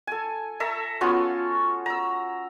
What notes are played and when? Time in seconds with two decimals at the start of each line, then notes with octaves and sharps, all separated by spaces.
0.07 A4 G#5
0.60 A4 E5 A#5
1.01 B3 C#4 F4 F#4
1.86 A#5 E6